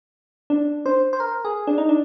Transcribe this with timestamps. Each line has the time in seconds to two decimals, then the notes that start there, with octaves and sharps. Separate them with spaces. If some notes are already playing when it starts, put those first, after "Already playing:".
0.50 D4
0.86 C5
1.13 C5
1.20 A#4
1.45 G#4
1.67 D4
1.78 D#4
1.89 D4